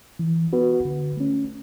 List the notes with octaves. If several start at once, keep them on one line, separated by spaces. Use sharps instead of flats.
E3
B3 F#4 B4
D3
A3 C#4